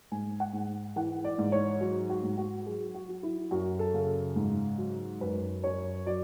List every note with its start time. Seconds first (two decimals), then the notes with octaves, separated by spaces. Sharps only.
0.11 G#2 G#5
0.40 F#5
0.53 G#2
0.96 E3 F#5
1.24 D5
1.38 G#2
1.52 C#5
1.81 F#3
2.10 F#4
2.23 G#2
2.38 F#4
2.66 F#3 G#4
2.94 F#4
3.09 F#3
3.23 E4
3.51 F#2 F#4
3.79 A4
3.94 C#3
4.36 G#2
4.78 F#3
5.21 F#2 B4
5.64 F#2 C#5
6.06 F#3 D5